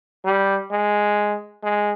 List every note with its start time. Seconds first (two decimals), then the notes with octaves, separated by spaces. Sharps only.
0.25 G3
0.71 G#3
1.63 G#3